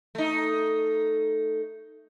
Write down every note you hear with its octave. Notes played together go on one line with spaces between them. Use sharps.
A3 D#4